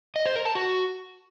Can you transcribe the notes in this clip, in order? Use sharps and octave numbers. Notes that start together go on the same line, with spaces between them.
D#5
C5
A#4
A5
F#4